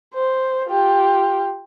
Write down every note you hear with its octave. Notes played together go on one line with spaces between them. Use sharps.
C5
F4 G4